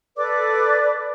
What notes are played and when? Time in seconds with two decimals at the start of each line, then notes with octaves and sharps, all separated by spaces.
0.16 A4 B4 D5 D6